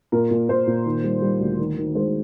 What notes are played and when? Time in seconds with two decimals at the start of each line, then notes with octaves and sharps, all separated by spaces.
0.12 A#2 A#4
0.31 A#2
0.49 A#2 C5
0.67 A#2
0.86 D#3
1.04 G3
1.22 G3
1.41 D2
1.59 D#3
1.77 D#3
1.95 G#3 C5